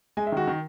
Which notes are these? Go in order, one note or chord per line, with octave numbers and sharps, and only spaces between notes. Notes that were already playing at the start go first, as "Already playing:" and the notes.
G#3 G#5
E5
D#3 F#4
D#3